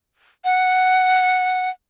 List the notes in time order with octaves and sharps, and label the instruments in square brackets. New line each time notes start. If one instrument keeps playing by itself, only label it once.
[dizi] F#5